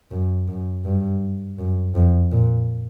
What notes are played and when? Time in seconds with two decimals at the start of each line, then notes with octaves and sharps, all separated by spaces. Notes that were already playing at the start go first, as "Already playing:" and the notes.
0.11 F#2
0.48 F#2
0.85 G2
1.59 F#2
1.95 F2
2.32 A#2